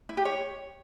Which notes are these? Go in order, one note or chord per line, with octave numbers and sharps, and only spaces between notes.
E4
G4
C#5